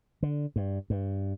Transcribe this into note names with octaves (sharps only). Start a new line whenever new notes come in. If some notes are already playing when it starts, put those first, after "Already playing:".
D3
G2
G2